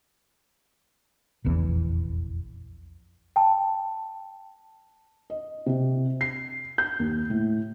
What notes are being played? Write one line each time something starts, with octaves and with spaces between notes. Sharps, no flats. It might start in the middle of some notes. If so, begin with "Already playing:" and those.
F1 A#1 E2 E3
G5 A5
D#5
C3
C7
G6
D#2
A2